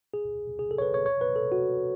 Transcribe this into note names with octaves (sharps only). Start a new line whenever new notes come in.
G#4
G#4
A4
C#5
B4
C#5
C#5
B4
A4
F#4